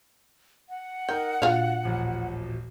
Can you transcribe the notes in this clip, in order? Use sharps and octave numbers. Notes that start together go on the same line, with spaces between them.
F#5
D#4 A#4 G5
A#2 D4 F4 F#4 G#4 F5
D#1 A1 F3